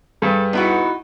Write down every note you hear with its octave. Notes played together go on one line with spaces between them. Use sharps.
G2 G#4 A4 B4
B3 D#4 E4 F#4